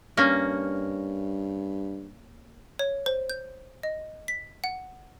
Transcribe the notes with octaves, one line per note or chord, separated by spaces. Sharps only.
G2 A#3 C#4
C#5
C5
G6
D#5
B6
F#5